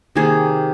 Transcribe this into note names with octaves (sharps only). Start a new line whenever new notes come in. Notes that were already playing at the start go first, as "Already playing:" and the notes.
C3 D#3 A#3 G#4